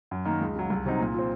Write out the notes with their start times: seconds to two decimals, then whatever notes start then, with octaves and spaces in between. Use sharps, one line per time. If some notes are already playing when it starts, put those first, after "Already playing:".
0.11 F#2
0.25 D#3 A#3
0.41 C#2
0.56 C#3 F#3
0.70 C2
0.85 C3 F#3 C4 D#4
1.00 A#2
1.14 F3 C4